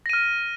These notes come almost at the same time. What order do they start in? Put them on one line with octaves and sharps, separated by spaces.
A#6 D#7 F6